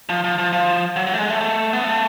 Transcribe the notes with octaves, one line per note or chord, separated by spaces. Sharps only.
F3
F3
F3
F3
F#3
F#3
A3
G#3
A3
A3
B3
A3